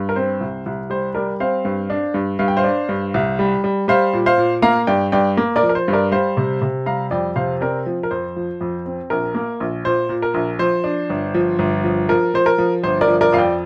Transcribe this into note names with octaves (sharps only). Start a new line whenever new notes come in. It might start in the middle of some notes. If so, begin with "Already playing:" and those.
Already playing: G2
A#4
C4 C5
C2
C2
G3 C5
G3 A#4 D5
C4 C5 F5
G2
D4
G2
G2 F5
G5
C5 F5
D4
G2
C2
G3
G3
G3 C5 F5
A#2
C5 F5
A#2
A#3 F5 A#5
G2 D5 G5
G2 D5 G5
A#3
A#4 D5
F3
A#4
C5
G2
A#4 D5
G3 C5 F5
C3
C3
G3 F5 A#5
F2 D5 G5
C3 C5 F5
C4 A#4 D5
F3
A#4
F2 C5
F3
F2
C4
A#1 A#4
A#3
A#1
A#2 C5
A#2
A#4
A#1
F3 C5
D4
G1
F3
G1
F3
F3 A#4
F3 C5
A#4
F3
G1 C5
A#4 D5
F3
A#4 D5
F2 F5
D5 G5